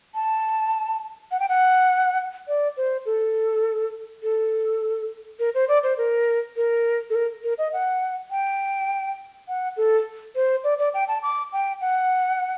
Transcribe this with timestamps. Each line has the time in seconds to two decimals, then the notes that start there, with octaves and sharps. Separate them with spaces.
0.15 A5
1.31 F#5
1.40 G5
1.49 F#5
2.48 D5
2.77 C5
3.06 A4
4.23 A4
5.39 A#4
5.55 C5
5.69 D5
5.83 C5
5.98 A#4
6.56 A#4
7.10 A4
7.15 A#4
7.44 A#4
7.58 D#5
7.73 F#5
8.31 G5
9.48 F#5
9.77 A4
10.36 C5
10.64 D5
10.79 D5
10.94 G5
11.08 A5
11.23 D6
11.53 G5
11.81 F#5